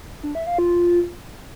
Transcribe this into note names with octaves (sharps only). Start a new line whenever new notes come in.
D4
E5
F5
F4